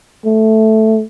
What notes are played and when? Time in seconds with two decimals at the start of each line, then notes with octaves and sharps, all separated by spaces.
0.25 A3